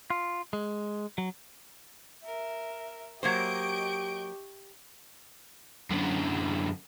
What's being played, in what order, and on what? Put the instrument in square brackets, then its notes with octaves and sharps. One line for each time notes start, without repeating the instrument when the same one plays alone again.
[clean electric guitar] F4
G#3
F#3
[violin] A#4 [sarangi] E5
[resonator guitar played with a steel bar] F#3 A#3 C5 [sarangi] G4 [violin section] D#5 D7 [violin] C#6 G6
[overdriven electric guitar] F#2 D3